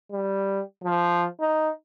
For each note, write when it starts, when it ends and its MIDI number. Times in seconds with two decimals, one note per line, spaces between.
0.12 0.61 55
0.84 1.26 53
1.40 1.70 63